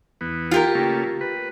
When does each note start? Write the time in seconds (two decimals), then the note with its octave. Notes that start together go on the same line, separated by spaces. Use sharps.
0.21 E2 B3
0.51 F4 G4 A#4
0.75 C#3 A3 A#3
1.21 B4